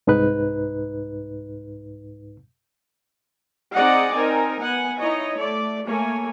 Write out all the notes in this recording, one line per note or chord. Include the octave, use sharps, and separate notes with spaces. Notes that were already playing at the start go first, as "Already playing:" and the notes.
C2 G#2 D#4 B4 F#6
C4 D#4 G#4 D5 D#5 F#5
C4 D#4 A#4 G#5
B3 F#5 G#5
D#4 E4 C#5 D#5
A3 D5
A3 A#3 C#5 G#5